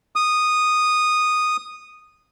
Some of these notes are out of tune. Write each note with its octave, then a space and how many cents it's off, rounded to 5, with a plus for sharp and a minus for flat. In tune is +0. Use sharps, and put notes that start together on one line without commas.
D#6 -10